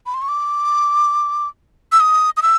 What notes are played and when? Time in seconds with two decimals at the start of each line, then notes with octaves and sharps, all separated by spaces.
0.06 B5
0.14 C6
0.22 C#6
0.28 D6
1.92 E6
2.00 D#6
2.37 D#6
2.42 E6